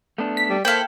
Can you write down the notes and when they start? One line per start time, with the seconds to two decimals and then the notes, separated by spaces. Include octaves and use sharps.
0.18 A3 B3 D4
0.37 B6
0.49 G3
0.65 A#3 E4 A4 C5 F5 G5